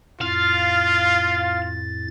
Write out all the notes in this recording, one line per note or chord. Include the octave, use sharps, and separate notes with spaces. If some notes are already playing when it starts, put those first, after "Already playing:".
F2 A2 F4 F5 A6